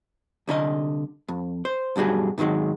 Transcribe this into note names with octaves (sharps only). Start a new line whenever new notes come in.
C2 D3 A4 D#5
F2
C5
B1 G2 G3 F#4 G#4
G#2 D3 D#3 F#3 G#3